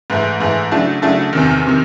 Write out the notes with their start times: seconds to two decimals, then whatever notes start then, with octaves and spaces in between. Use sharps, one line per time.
0.10 G#2 E3 A3
0.40 G#2 E3 A3
0.71 C#3 F#3 A3 D4
1.02 C#3 F#3 A3 D4
1.33 E2 C3 D#3
1.66 C3 D#3